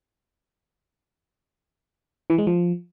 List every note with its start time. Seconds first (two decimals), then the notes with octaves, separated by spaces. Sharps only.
2.30 E3
2.38 G#3
2.47 F3